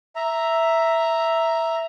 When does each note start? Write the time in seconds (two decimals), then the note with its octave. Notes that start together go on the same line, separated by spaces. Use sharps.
0.16 E5 A#5